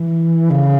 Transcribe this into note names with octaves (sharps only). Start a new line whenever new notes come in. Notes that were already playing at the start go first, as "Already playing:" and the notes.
Already playing: E3
C#3